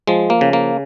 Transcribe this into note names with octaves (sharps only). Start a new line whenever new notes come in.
F3 G#3
A#3
C#3
A#3